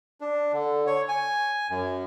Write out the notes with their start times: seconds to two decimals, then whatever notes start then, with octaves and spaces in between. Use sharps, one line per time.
0.21 D4
0.53 D3
0.87 C#5
1.08 G#5
1.71 F#2